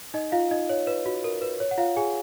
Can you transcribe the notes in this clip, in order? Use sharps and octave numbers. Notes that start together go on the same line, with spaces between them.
D#4 D#5
F4 F5
D#4 D#5
C#5
B4
F#4
A#4
B4
C#5
F#5
F4 F5
G#4 G#5